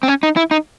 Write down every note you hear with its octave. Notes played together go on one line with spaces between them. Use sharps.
C4
C#4
D#4
E4
D#4